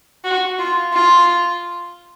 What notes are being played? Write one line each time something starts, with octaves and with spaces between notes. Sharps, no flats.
F#4
F4
F4